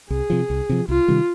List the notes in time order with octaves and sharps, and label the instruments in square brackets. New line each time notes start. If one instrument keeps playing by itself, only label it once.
[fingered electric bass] C2 [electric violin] G#4
[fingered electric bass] C3 F3
C2
C3 F3
[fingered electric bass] C2 [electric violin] F4
[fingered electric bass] C3 D#3 G3